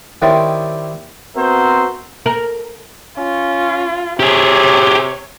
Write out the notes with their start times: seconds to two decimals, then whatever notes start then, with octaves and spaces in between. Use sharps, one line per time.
0.22 D#3 G3 C4 E4 C#5 D5
1.36 B3 C4 F#4 A#4 C5 E5
2.26 A#4
3.18 C#4 F4
4.20 C3 G4 G#4 C#5